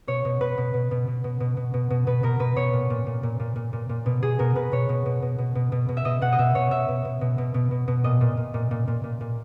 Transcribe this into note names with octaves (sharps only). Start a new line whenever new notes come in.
B2 C#5
B2
B2 B4
B2
B2
B2
B2
B2
B2
B2
B2
B2
B2 B4
B2 A#4
B2 B4
B2 C#5
A#2
A#2
A#2
A#2
A#2
A#2
A#2
A#2
B2
B2 G#4
B2 A#4
B2 B4
B2 C#5
B2
B2
B2
B2
B2
B2
B2
E5
B2 D#5
B2 F#5
D#5
B2 E5
B2 C#5
B2 E5
B2
B2
B2
B2
B2
B2
B2
A#2 D#5
A#2
A#2
A#2
A#2
A#2
A#2
A#2